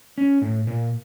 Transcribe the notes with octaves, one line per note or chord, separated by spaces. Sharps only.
C#4
A2
A#2